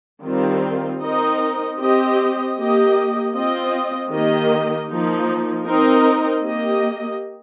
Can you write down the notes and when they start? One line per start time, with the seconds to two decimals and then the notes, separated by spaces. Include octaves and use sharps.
0.23 D#3 G3 C4 F4
1.01 C4 D#4 A#4 D#5
1.79 C4 G4 D#5
2.56 A#3 G4 D#5
3.34 C4 F4 D#5
4.12 D#3 A#3 G4 D#5
4.89 F3 A#3 D#4
5.67 C4 D#4 A#4 D#5
6.44 A#3 G4 D#5